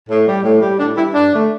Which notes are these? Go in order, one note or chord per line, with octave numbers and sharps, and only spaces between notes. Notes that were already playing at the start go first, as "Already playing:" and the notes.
A2
G3
A2
G3
A2 D4
G3 E4
G2 D4
D3 A3